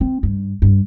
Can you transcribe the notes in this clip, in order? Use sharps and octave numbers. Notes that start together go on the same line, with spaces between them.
C4
G2
G2